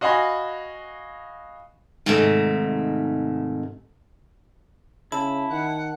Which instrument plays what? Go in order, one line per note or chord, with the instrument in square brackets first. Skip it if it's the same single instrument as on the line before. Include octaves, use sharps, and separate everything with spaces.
[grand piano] F#4 D#5 F5 F#5 G#5 B5
[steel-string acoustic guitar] G#2 C3 D#3 G#3 A3
[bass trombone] C#3 [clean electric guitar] E4 [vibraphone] A5
[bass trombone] D#3 [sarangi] F#5